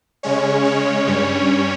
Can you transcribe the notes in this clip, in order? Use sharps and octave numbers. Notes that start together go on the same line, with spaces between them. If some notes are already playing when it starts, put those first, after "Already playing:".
C#3 G#3 C#4 C#5
C#5
G2 G3 C#4